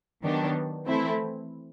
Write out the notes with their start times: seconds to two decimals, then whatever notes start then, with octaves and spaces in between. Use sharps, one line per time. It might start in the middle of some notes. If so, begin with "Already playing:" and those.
0.23 D#3 F#3 B3 D4 G4
0.86 E3 A3 C4 E4 A4